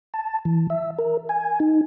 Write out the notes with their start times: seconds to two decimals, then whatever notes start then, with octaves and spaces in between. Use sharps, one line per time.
0.14 A5
0.45 E3
0.70 E5
0.99 A#4
1.29 G#5
1.60 D#4